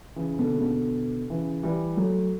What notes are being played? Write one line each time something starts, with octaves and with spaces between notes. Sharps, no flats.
C#3 E3
B2 D3
C#3
B2 D3
C#3 E3
E3 G3
F#3 A3